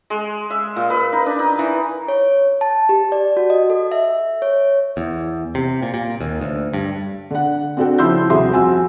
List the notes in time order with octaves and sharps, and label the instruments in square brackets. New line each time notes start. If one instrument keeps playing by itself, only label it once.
[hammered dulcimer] G#3
E5
A#2
B4
D#4
D4
D#4
E3
[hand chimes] C#5
A5
G4
D5
F#4
D#5
A4
E5
C#5
[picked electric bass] E2
C3
A#2
A#2
D#2
D2
G2
[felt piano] D3 F#5
C4 D4 F#4 A4 G5
C#3 F3 E4 C6 E6 G6
D#1 C3 F#4 G#4 E5 C6
F2 F#4 G#5 E6